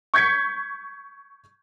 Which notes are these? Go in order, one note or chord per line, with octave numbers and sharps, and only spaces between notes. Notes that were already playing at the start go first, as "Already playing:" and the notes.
C#6 G6 G#6 B6 C#7